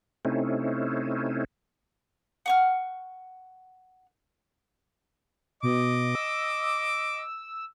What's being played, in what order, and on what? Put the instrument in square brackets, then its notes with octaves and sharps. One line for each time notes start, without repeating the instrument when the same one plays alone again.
[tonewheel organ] C3 A3 C4 C#4 D#4 E4
[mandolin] F#5 C#6 F6
[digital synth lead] B2 [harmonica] D#5 D6
[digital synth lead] E6